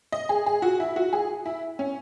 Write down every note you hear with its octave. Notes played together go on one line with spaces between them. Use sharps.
D#5
G#4
G#4
F#4
E4
F#4
G#4
E4
C#4